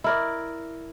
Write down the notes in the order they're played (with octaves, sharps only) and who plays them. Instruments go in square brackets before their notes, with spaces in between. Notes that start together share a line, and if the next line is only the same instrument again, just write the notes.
[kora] E4 A#4 D5